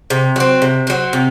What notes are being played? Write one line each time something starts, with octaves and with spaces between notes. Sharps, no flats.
C3
F#3 C4
C3
F#3 C4
C3